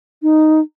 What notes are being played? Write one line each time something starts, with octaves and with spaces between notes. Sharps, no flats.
D#4